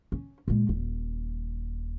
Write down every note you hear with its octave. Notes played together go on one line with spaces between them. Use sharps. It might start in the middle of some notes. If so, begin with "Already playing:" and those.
C#4
A#2 G#3
D#1